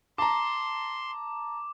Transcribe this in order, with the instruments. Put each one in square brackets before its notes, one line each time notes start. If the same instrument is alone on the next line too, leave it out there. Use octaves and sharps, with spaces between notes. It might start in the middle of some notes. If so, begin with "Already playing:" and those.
[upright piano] A5 A#5 [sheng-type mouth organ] C6 [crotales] D6